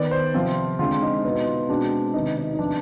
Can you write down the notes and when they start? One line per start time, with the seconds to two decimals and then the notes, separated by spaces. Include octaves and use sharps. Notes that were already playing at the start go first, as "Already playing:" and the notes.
Already playing: D#3 B3 D5
0.11 C5
0.34 C3 F3 C4 F4
0.79 D3 G#3 C4 F4
1.02 D#4
1.24 B2 B3 D#4
1.46 F4
1.69 B2 G#3 C4 D4
2.14 C3 D#3 B3 D#4
2.37 D#4
2.54 D#4
2.59 C3 F3 B3 D4